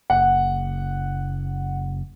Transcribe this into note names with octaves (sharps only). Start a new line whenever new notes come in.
F#1 F#5